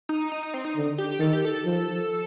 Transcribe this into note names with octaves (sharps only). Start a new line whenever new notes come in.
D#4
D#4
D#4
C4
D#4
D3
G4
D#3 A4
G4
A4
F3